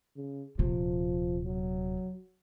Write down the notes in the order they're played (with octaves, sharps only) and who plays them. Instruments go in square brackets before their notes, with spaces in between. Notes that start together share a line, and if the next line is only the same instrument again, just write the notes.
[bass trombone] C#3
[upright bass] D#1 C3 [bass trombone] F3
[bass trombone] F#3